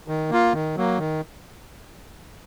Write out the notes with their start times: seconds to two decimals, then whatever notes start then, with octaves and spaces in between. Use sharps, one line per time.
0.08 D#3
0.30 A#3 F4
0.53 D#3
0.77 F#3 A#3
0.98 D#3